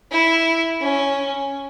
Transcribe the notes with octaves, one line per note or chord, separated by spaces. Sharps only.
E4
C#4